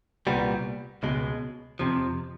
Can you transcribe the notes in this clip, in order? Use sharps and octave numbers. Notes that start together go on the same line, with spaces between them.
C2 A#2 G3 B3
C#2 B2 G#3
F2 C3 F3